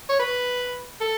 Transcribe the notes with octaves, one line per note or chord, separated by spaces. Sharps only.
C#5
B4
A4